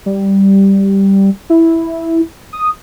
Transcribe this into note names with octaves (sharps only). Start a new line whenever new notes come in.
G3
E4
D#6